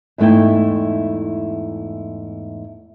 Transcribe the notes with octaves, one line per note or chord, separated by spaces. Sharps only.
E2 G#2 A3 E4 G5